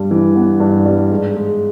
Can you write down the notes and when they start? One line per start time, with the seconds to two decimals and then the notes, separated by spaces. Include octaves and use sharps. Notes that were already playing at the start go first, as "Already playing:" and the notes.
Already playing: G2 G3
0.11 E3
0.35 B3
0.60 G2
0.86 G3
1.11 G#2
1.36 G#3